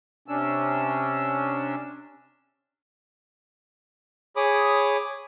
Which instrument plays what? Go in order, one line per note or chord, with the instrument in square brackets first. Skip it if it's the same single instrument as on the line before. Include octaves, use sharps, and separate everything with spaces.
[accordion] C3 C#4 D4 E6
[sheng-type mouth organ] G#4 C#5 B5 D6 D#6